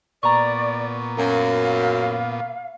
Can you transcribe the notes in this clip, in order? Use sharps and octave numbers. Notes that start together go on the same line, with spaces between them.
A#2 B3 D5 A#5 C#6
F#2 F5